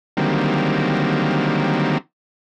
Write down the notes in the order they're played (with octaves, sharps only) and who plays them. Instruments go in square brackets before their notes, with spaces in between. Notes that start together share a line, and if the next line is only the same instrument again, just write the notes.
[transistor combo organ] D3 D#3 F#3 G3 A#3 C4